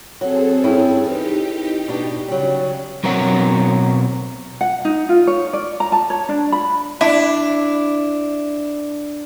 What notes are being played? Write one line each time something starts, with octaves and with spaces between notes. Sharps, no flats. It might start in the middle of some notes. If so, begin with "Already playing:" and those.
F#3 C4 G#4 A4
G2 C#4 E4
E3 D#4 G4
B2 D4
C#3 F#3 G3
B1 F#3 C4 A#4 C#5 F#5
F#5
D#4
F4
C#5
D5
A#5
A5
C#5
D4
B5
D4 E4